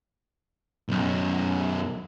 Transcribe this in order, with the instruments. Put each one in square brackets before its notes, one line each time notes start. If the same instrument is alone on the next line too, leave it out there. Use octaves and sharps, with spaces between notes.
[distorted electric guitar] B1 F#2